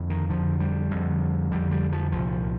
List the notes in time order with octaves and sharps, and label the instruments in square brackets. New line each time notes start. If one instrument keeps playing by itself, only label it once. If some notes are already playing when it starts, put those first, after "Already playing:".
Already playing: [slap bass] F2 D3
D#3
F2 D3 F3
G3
F2 D3
F2 D3 G3
G3
F3
C2 A#2 F3